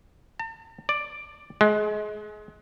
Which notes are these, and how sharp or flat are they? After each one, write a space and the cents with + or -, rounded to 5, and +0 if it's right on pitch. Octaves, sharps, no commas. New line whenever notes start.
A5 +45
D5 +5
G#3 +25